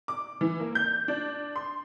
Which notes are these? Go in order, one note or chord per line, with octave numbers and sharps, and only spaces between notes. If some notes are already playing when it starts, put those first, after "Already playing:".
D6
E3
A#3
G6
D4
C6